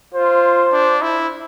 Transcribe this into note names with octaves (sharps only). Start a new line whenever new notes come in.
F4 C5
D4
E4